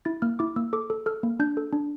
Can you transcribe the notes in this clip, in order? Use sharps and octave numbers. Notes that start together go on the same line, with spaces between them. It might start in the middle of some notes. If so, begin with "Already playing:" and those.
E4 A6
A#3 F6
E4 D6
A#3 E6
A4 D6
A4
A4 F6
A#3
D4 G6
A4
D4